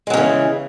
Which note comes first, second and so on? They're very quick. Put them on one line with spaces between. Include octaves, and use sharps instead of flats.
G#3 F#3 C#3 E3